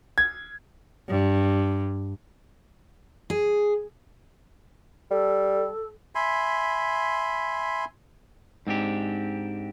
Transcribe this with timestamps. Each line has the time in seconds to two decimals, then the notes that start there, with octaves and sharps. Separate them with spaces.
0.18 G#6
1.09 G2
3.30 G#4
5.11 G3 A4
6.15 E5 G#5 B5 C6
8.67 G#2 C4 D4 G4